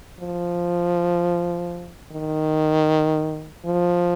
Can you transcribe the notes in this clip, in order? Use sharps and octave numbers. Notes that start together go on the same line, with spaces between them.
F3
D#3
F3